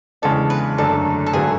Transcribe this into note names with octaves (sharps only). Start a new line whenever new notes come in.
E2 C#3 G#3 D4 A4
B4
F#2 D3 A3 D4 A4
A4
G#1 D3 F#3 A3 G#4